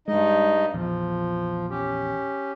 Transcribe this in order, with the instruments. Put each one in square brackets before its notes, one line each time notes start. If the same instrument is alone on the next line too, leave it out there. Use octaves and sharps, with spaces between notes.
[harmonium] G2 D#4 D#5 [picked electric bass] G#3
[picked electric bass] A#1 E2 [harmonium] F3
[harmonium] C#4 G4